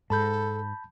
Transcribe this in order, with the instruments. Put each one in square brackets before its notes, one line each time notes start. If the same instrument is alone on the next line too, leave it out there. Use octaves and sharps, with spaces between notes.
[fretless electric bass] G#2 [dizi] A4 [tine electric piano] A5 B5 G6